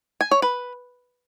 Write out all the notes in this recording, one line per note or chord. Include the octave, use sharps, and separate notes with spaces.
G#5
C#5
B4